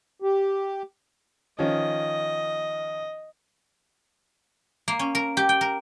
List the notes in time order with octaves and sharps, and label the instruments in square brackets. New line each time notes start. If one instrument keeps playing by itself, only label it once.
[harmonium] G4
[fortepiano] D#3 F3 C#4 [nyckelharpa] D#5
[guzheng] A#3
C#4
A#4
G4
G5
A#4